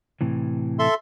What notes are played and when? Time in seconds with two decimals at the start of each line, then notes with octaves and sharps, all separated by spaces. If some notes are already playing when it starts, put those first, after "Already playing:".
0.21 A2 C3 E3
0.79 A4 E5 C6